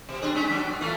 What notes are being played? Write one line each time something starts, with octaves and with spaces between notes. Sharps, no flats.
B2
C4 D4 G#4
G#3 C#4 D#4
F#3 D4
B2
E3 A3 F4